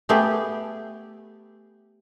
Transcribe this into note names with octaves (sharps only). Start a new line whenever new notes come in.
A3 B3 G4 G#4